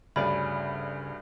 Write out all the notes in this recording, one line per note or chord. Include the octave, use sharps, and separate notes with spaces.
D2 G2 C#3 D5 G#5 B5